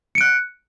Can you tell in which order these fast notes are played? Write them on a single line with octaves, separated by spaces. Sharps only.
C#7 D7 F#6